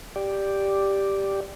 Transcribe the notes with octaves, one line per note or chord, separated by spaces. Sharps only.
G4 D5